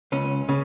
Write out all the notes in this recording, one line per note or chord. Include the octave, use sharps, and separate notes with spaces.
C#2 C#4
C#3